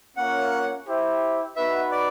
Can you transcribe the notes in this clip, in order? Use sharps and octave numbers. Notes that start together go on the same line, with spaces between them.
A#3 C#4 F4 A#4 C#5 F#5
E4 G4 C5 E5 G5
B3 D#4 F#4 B4 E5
D5